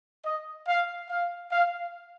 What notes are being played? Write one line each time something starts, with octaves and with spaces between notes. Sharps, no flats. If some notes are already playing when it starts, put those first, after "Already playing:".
D#5
F5
F5
F5